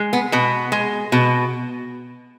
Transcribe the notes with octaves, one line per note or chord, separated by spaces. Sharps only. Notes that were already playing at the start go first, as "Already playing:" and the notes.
Already playing: G#3
B3
B2 B3
G#3
B2